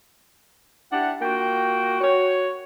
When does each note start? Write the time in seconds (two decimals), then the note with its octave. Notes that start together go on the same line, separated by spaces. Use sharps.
0.92 D4 E4 G4 F#5
1.21 A#3 F4 F#4 G5
2.01 F#4 C#5